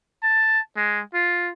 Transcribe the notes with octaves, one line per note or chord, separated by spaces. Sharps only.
A5
G#3
F4